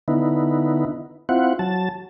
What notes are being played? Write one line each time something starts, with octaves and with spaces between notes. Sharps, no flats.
D3 B3 D#4 E4
C4 E4 F4 F#5
F#3 A5